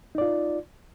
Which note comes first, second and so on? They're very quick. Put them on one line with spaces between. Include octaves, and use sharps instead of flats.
D#4 D5 F4